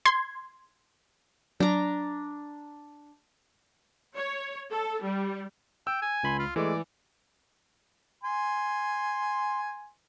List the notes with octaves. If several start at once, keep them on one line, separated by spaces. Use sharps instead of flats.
C6 G#6
F#3 D4 A#5
C#5
A4
G3
G5 E6
G#5
C#2 B5 C6
F4
E3 G#3 A3 D5
G#5 C6